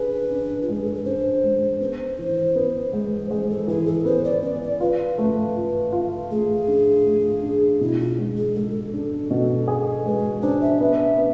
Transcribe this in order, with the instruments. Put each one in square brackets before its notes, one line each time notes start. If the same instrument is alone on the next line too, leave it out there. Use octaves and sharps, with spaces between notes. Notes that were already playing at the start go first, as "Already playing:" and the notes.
Already playing: [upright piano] D4 G#4 [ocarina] B4
[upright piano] D4
[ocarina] F4
[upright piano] G#3 [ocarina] G#4
[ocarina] A4
B4
[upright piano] D4 [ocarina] C5
[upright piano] G#3
[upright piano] B3 [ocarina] C5
[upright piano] E3
B3
G#3
[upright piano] G#3 [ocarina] C5
[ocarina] A4
[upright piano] E3 [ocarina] G#4
[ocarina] A4
[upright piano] B3 [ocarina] C5
[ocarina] D5
[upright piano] B3 [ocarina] D5
[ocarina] D5
[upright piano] F4 [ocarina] B4
[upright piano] A3
F4
F4
[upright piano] A3 [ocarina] G#4
[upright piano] D4
A3
D4
[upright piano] B2 [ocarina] E4
[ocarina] F4
[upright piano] G#3
[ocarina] G#4
[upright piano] G#3 [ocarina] A4
[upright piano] D4
B2
G#4
[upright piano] G#3 [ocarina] B4
[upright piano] D4 [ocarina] C5
[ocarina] E5
[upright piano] B3
B3